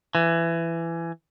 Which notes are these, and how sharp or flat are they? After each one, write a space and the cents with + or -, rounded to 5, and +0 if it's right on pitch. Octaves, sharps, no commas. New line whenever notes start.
E3 +20